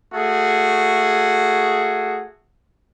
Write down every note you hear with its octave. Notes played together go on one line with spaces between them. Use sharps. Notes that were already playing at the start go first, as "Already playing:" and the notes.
A3 F#4 G#4